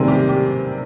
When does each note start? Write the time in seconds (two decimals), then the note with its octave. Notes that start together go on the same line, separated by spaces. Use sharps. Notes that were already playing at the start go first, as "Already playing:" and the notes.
Already playing: C3 D#3 G3 C4 G#4
0.08 G4
0.29 G4